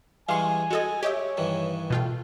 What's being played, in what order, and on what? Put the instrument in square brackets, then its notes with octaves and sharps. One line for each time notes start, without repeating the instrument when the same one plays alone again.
[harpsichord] E3 G3 G#3 [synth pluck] F5 C6 C#6 [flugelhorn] G#5
[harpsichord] G#3 [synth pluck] F#4 A4 D#5
[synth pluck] G4 D#5 E5 [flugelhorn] C#5
[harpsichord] G2 D#3 E3
[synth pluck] B2 F4 G5 [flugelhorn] A3